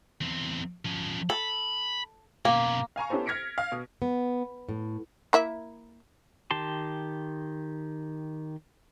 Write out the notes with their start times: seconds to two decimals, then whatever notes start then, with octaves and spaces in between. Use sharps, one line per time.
0.21 E2 C4
0.85 F3 C#4
1.30 A4 B5
2.45 B2 A#3 C#4
2.96 F5 G#5 A#5 C#6
3.10 B3 C#4 E4 G4 A4 C5
3.26 F6 G#6 A#6 B6 C#7 D7
3.58 F5
3.72 B2
4.02 B3
4.69 A2
5.33 A#3 E4 E5
6.51 D#3 G4 A5 C6